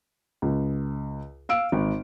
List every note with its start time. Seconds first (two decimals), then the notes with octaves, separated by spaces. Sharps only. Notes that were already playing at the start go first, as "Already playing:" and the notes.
0.42 C#2
1.49 F5 E6 D7
1.72 G#1